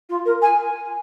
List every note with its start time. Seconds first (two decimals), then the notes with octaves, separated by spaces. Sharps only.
0.09 F4
0.25 A#4
0.42 G#5